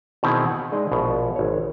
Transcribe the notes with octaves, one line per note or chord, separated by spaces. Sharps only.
B2 D#3 C4 E4 G#4
F#5
G#3 D#4 G#4 D5 D#5
A#1 B2
G#1 C#5